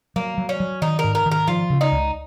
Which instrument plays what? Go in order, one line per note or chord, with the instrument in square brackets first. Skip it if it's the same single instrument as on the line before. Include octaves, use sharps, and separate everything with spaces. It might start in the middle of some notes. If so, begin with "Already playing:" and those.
[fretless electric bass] F#3 [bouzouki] A#3
[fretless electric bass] F#3
[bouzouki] C#4
[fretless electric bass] F#3
[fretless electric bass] D#3 [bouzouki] D#4
[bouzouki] A#4
[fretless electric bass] G#2
[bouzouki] A#4
[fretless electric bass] D#3
[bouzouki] A#4
[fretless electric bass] F3 [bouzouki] F4
[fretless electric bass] C#3
[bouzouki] D#4
[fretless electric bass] C#2